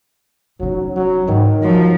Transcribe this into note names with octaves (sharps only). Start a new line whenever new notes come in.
F1 F#3 C#4
F#3
G#2 D#3
F3 F#3